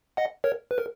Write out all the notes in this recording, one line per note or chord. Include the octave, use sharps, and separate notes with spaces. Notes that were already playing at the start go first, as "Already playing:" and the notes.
D#5 F#5
A#4 C#5
B4
A#4